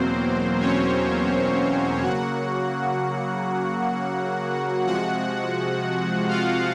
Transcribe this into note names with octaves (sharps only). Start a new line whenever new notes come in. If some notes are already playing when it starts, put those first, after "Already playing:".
Already playing: E2 B2 F#3 A#3 C4 C5
C#4 C#5
C#3 F#3 A#3 F#4 F#5
C3 F3 G#3 F#4 F#5
F4 F5